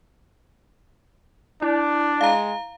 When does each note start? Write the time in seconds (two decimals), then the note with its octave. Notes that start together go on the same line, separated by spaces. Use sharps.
1.62 D4 E4 D5
2.21 G#3 F5 A#5